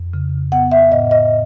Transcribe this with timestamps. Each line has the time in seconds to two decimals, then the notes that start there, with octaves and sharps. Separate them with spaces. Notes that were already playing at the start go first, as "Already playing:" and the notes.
Already playing: F2
0.13 C#3
0.52 B3 F#5
0.72 E5
0.91 A2 D#5
1.11 D#5